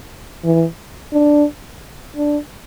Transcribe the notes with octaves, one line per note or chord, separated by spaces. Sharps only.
E3
D4
D4